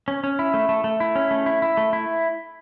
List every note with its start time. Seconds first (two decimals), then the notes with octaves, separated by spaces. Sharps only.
0.08 C#4
0.24 C#4
0.39 E4
0.54 A3
0.69 A3
0.84 A3
1.00 E4
1.16 C#4
1.31 A3
1.46 E4
1.62 E4
1.77 A3
1.93 E4